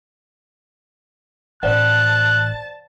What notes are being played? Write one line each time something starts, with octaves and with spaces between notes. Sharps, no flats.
A1 C5 D5 F#5 A5 F#6